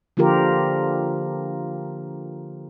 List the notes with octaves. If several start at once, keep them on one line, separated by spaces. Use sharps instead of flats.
D3 F3 A#3 F4 G4 A#4